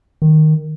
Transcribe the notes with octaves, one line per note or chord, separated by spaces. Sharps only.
D#3